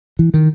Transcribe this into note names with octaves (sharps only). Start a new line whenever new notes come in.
E3
D#3